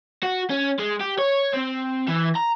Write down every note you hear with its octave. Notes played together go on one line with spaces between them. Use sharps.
F#4
C#4
G#3
G4
C#5
C4
E3
A#5